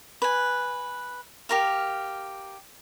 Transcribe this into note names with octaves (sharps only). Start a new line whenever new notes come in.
B4 G#5
G4 A#4 F5